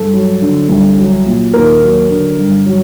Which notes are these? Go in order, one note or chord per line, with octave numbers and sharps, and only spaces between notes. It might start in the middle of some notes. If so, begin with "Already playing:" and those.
Already playing: G2 A4
F#3
D3
C2
F#3
A#2
D#2 A#4
F#3
D3
G2
F#3